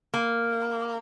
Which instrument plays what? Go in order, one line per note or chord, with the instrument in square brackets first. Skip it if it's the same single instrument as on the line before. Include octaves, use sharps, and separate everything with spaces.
[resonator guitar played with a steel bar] A#3